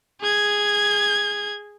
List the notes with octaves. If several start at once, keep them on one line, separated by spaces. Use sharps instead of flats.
G#4 G#6